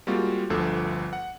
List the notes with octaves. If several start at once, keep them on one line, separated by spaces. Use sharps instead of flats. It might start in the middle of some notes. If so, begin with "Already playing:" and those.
G3 G#3 A#3 C4 F4 F#4
G1 D2 D3 F3 A4
F#5